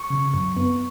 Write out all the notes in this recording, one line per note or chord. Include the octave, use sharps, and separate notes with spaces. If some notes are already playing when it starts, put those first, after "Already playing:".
Already playing: C#6
C#3
F#2
B3